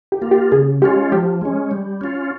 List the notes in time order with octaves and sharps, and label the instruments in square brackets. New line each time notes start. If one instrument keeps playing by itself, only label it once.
[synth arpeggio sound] G4
[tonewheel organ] A#3 F4
[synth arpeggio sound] G4
[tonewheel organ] C#3 [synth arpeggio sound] G#4
[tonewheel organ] G#3 C#4 F4 [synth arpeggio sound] G4
[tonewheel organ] F3 [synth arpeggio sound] G4
[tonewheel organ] G#3 C#4
G3
C#4 F4